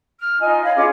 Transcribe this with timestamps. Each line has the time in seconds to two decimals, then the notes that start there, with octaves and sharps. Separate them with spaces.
0.21 F6
0.40 D#4 F4 D#5 G#5
0.63 C#5 D#5 F5 B5
0.76 C#4 F4 G#4 D6